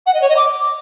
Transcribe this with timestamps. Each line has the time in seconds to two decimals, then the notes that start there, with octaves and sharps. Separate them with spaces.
0.06 F#5
0.13 D#5
0.21 C#5
0.29 D#5
0.36 D6